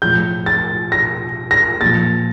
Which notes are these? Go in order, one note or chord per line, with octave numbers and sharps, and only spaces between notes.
A2 F3 G6
A6
A#6
A#6
A#2 F3 A6